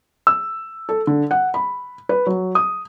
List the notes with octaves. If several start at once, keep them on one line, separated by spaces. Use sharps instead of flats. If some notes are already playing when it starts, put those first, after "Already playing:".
E6
A4
D3
F#5
B5
B4
F#3
D#6